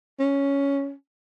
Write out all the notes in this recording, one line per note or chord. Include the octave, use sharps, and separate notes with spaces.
C#4